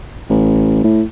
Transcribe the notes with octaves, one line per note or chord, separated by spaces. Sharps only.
A1
A2